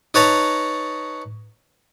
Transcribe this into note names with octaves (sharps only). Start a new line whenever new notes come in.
D#4 B4 C#5 A5 A#5